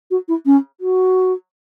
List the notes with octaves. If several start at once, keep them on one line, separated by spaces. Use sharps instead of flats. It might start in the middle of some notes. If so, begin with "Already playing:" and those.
F#4
E4
C#4
F#4